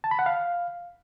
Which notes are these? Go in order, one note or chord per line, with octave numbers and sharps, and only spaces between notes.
A5
B5
F#5
F5